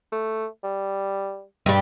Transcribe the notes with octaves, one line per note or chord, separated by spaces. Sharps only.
A3
G3
G2 G3